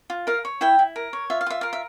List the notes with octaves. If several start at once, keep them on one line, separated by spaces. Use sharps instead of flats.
F4
A#4 F5
C#5
E4 E5 G5
E4
A#4
C#5
F4 E5
F5
F4 E5
A#4 F5
E5